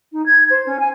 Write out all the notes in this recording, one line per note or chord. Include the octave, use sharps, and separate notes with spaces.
D#4
G#6
C5
C#4
G#5